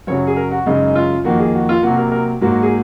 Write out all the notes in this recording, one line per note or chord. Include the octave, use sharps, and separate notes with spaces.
F#2 C#3 F#3 C#5
G#4
A#4
F#4
F#2 C#3 G#3 D#4
D#4
F4
F2 D#3 A#3 F#4
G#4
F#4
F4
C3 F#3 A#3 F#4
A#4
A#4
G#2 F#3 A#3 F#4
G#4